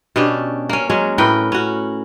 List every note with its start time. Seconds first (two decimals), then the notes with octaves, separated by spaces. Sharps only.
0.16 B2 C#4 D4 G4
0.69 A#3 C#4
0.90 F#3 G#3 C#4
1.18 A2 A#4 B4 G5
1.52 C#4 F#4